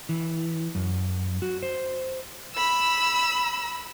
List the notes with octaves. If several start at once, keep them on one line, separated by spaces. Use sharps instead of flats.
E3
F#2
F#4
C5
B5 E6